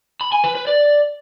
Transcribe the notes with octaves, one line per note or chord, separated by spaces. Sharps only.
B5
G#5
B4
B4
D5